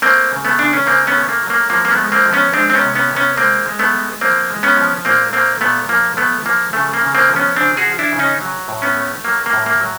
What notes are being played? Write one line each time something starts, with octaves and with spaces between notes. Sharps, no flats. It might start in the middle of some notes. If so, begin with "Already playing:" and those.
A3 A#3 C4
C#3
A3 B3
C#3 D4
C#4
C#3 A#3 C4
B3 C#4
A3
A#3
F#3
A#3
F3 A#3
A#3
A3 B3
G#3
A#3 C4
F3
B3 C#4
G#3 C4 D4
C4
B3 C#4
C3
B3 C#4
C3
B3 C#4
G#3 A#3 C4
G#3
A3 B3
G#3
F3 A#3 C4
G#3
B3 C#4
F3
A#2 A#3 C4
A3 A#3 C4
A#2 A3 B3
F3 A#3
A3 B3
F3 A#3
C#3 A3
A#3
C#3
A#3 C4
F3
B3 C#4
C#3 C4 D4
F#4 G#4
F3
D4 E4
C#3
C#4 D#4
F#3
A2
B3 C#4
A3
F#3 A#3
A#3
A2
A#3
F#3